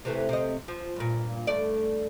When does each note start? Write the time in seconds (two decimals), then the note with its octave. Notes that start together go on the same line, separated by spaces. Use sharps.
0.05 C3 E3 A3
0.29 C3 D#5
0.68 F3
0.96 G2 A#2
1.47 G2 A3 D5